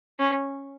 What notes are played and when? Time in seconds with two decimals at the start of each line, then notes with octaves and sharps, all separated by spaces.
0.19 C#4